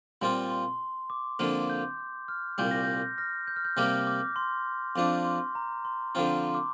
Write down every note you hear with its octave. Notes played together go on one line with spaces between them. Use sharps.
A#2 G3 C4 F4 C6
C6
D6
F2 D3 F3 A#3
G6
F6
C2 A#2 G3 G6
A#6
G6
F6 A#6
G6
F6
G6
C3 G3 A#3 G4 F6
D6
C6
F2 F3 D4 D6
C6
A#5
C6
D3 F3 C4 F4
C6
D6